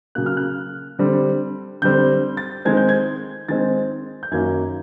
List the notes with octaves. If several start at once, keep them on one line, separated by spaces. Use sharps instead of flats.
C#3 F#3 A#3 F#6
F6
F#6
D3 G3 C4
D3 G3 C4 G6
A6
D#3 G#3 C4 G#6
G6
G#6
D#3 G#3 C4 A6
G6
F#2 D#3 F#3 A#3 C#4 G#6